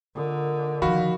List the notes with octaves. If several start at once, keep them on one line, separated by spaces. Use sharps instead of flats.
A#2 D3 D#5
D#3 F3 F#4 F5 B5